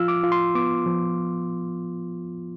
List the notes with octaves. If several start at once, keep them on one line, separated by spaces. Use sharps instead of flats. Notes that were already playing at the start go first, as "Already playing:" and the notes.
Already playing: F3 F4 E6 F6
D6
F4
C6
B3 D6
F3